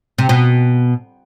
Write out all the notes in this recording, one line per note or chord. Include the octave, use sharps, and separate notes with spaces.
C3
B2